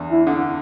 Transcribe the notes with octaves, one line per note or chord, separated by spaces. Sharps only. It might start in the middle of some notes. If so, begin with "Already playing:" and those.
Already playing: E2 D3
E4
D3